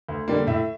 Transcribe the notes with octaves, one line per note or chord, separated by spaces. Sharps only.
D2
D3 G3 A#3
A2 E5